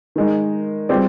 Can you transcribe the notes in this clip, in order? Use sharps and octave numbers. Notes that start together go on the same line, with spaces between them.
D#3 G#3 D#4
G3 C4 F4 G#4 D5